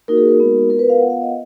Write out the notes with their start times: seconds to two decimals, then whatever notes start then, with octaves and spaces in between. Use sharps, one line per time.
0.08 A#3 D#4 F#4 A#4
0.17 G#4
0.28 A#4
0.39 G#3 B3 D#4 F#4
0.69 B3 F4 A#4
0.79 B4
0.89 F5
1.00 B3 F4 F#5
1.10 F5
1.22 D#5